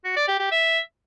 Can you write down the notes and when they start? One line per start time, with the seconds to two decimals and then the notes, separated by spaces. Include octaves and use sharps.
0.04 F#4
0.16 D5
0.28 G4
0.39 G4
0.51 E5